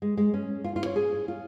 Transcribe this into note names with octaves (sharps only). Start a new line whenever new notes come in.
G#3
G#3
C#4
F4
F4
C#5
G#4
F4